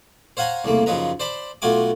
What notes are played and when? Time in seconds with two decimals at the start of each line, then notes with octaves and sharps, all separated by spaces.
0.37 C5 C#5 F5 F#5 G#5 A#5
0.65 C2 C#3 A3 A#3
0.86 F#2 C#3 F3 D#4 B4 A#5
1.20 C5 D5 A5 B5
1.62 B1 A3 F4 F#4 G#5 D6